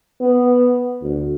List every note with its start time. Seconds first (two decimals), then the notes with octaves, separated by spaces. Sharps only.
0.21 B3
1.02 D2